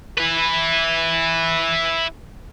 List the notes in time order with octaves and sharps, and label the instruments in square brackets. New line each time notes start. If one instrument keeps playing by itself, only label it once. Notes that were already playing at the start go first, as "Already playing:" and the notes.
[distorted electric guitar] E4 B4